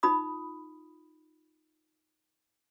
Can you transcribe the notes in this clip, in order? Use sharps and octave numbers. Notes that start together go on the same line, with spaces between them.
D#4 F4 B5 D#6